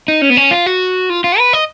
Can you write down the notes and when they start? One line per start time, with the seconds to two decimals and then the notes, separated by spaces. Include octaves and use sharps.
0.08 D#4
0.22 C#4
0.30 B3
0.37 C#4
0.51 F4
0.66 F#4
1.10 F4
1.24 F4
1.39 B4
1.53 D#5